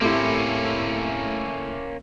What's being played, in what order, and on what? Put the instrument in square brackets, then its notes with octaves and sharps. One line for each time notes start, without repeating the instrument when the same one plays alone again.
[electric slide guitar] A2 C4 G4 [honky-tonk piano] A3 E4 [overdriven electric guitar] A#3 C#4